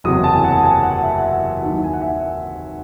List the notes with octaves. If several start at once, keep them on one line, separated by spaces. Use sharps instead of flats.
F#1 E2 C3 F#3 D#6
A5
G#5
F#5
G#5
F#5
E5
F#5
E5
D#2 D#3 F#3
G#5
F#5
E5